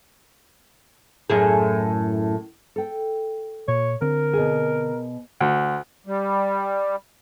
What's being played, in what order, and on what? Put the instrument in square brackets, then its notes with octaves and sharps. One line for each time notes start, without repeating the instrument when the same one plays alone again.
[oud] F#2 A2 G#4
[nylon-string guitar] A4 G5
[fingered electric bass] A#2 [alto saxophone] C#5
[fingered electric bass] D3 C4 [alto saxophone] A#4
[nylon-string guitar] B2 G#4
[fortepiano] D2
[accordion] G3